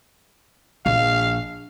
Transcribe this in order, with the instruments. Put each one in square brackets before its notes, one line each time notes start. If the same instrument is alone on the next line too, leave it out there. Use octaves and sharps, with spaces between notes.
[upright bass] A#1 [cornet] F5